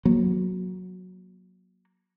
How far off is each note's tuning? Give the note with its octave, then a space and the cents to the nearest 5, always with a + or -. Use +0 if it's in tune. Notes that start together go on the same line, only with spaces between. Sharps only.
F#3 -10 A#3 +20